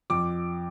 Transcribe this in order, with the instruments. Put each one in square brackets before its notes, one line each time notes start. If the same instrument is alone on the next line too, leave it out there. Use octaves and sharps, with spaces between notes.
[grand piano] F2 D6